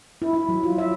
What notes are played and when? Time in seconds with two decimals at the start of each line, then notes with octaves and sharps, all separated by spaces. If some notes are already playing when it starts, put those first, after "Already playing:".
0.22 E4
0.33 E4
0.49 F#3
0.63 F4
0.78 E5